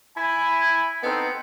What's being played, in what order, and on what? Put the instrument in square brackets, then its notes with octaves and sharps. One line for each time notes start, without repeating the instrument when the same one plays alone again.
[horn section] E4 G#5 B5
B3 C4 D#4 A4